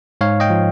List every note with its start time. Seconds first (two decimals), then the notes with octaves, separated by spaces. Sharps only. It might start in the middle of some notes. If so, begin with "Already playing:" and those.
0.21 G#2 C#5 F5
0.40 D#5 G5
0.50 F3